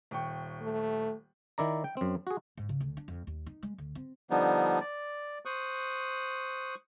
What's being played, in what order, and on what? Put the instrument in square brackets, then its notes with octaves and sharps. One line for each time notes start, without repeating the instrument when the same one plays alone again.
[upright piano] D#1 G5 C#6
[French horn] A3
[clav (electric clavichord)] D#3 E4 D5 A#5
G5
F#2 C4
F#4 G#4
[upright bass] G#2
C#3
D2
D4
F2
D#2
D#4
G#3
D2
C4
[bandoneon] D3 F3 G3 B3 D4 D#4
D5
C5 C#6 D#6 F#6